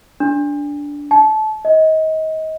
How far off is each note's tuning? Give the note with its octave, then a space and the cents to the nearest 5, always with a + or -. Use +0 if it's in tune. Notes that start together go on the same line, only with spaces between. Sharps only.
D4 -15
A5 -25
D#5 +25